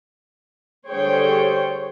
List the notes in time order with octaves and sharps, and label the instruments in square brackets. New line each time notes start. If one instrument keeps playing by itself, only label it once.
[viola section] D3 G3 G#4 C5 C#5 G5